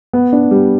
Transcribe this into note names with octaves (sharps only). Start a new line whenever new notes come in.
B3
D4
G3